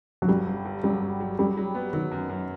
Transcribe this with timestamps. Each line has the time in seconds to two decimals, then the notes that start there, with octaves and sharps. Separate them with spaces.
0.22 F#3
0.28 G1 G3
0.47 G1
0.65 G1
0.83 F#3 G3
1.02 G1
1.20 F#3
1.39 F#3 G3
1.57 F#3
1.75 B3
1.93 D#3 F#3
2.11 F#2
2.30 F#2